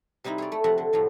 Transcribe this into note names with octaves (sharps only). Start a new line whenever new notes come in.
C3 G3 C4 D#4 E4
G#4 C#5 D5
A3
F2 C3 C4 E5 F#5
D3
A2 C3 F3 F#3